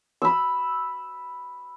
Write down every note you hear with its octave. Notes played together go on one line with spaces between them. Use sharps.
B5 E6